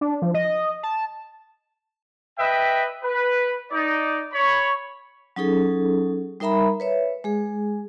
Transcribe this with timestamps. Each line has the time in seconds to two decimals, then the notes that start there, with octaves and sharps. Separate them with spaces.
0.01 D4
0.22 F3
0.34 D#5
0.83 A5
2.39 B4 D#5 E5 G5
3.03 B4
3.72 D#4 D5
4.32 C#5 B5
5.36 F#3 C#4 D#4 G#4 A4
6.40 G3 D#4 A#4 E5 A#5 B5
6.80 B4 C#5 E5
7.24 G#3 G#4